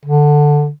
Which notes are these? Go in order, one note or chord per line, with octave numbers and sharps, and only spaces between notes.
D3